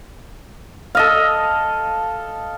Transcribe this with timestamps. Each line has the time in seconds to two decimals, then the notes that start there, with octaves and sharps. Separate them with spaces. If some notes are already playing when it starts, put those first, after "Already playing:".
0.95 A4 D#5 F5